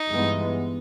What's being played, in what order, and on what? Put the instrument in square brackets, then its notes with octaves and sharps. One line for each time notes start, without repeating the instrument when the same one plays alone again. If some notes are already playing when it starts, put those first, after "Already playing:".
Already playing: [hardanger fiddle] D#4
[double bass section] G2 E3 G#3 B3